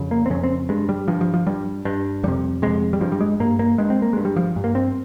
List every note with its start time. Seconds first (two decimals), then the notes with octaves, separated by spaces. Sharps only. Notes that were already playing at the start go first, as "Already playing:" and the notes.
Already playing: F2 C#3
0.11 A#3
0.26 C4
0.30 F2 C#3 C#4
0.44 C4
0.69 G2 G#3
0.89 G3
1.08 G2 F3
1.21 F3
1.34 F3
1.47 G2 G3
1.85 G2
2.23 F2 C3 G3
2.62 F2 C3 G#3
2.93 G3
3.01 G2 F3
3.12 G3
3.21 G#3
3.40 G2 A#3
3.59 A#3
3.78 G2 G#3
3.90 C4
4.02 A#3
4.13 G2 G#3
4.25 G3
4.37 F3
4.56 G2
4.64 A#3
4.75 C4